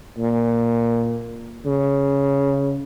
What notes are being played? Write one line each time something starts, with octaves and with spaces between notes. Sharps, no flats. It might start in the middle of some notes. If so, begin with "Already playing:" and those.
A#2
C#3